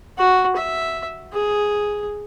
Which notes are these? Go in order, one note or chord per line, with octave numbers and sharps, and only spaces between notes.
F#4
E5
G#4